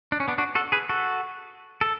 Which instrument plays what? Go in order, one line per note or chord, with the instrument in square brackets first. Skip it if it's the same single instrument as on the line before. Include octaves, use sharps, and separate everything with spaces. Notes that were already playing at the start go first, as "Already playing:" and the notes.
[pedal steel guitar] D4
C#4
B3 D4
D4 F#4
F#4 A4
G#4 B4
F#4 A4
A4